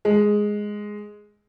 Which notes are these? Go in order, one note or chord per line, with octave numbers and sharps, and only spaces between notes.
G#3